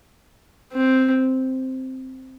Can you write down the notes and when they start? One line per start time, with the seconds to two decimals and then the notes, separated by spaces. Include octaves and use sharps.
0.73 C4